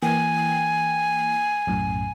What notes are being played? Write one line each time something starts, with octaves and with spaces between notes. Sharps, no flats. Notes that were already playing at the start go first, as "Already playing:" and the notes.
E3 A#3 G5 G#5
B1 F#2 A2